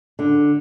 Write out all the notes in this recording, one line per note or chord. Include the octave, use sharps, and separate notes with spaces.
D3